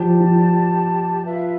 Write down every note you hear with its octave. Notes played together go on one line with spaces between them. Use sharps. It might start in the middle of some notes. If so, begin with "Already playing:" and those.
Already playing: F3 G4 D5 A5
F3
F4 B4 E5